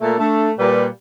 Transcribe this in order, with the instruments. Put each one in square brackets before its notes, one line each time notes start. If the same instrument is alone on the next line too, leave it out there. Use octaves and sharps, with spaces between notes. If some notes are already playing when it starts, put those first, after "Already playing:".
[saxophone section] A#2 A3
[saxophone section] A3 [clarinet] D4
[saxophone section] A#2 G3 [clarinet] B4